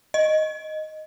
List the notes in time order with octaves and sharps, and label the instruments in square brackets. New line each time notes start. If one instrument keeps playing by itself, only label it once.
[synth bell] D#5